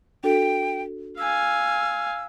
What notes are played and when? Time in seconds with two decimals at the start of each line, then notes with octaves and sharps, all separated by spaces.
0.24 D4 F#4 A4 G5
1.18 F5 G#5 E6